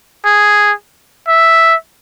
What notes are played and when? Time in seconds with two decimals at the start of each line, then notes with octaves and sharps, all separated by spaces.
0.25 G#4
1.28 E5